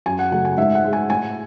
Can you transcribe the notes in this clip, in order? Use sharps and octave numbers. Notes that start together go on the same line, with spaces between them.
F#2 G#5
F#5
C#3 F#3 A3 F#5
G#5
G#2 E5
F#5
G#3
G#5
A2 G#5